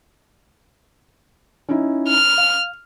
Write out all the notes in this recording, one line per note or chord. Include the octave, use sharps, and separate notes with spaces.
C#4 D#4 E4
F6
F5